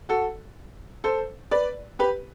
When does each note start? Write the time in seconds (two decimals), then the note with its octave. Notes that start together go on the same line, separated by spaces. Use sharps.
0.09 F#4 A4
1.04 A4 C5
1.51 B4 D5
1.99 G4 B4